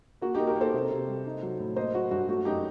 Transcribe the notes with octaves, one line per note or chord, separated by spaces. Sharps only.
A#3 F#4
A#3 D#4 G4
G4 A#4
A#3
A4 C5
C3
C3
G3
D#4
F#3
A2
A#3 C5 D#5
F#3 F#4
G2 F#4
A3 F#4
F#2 D#4 G4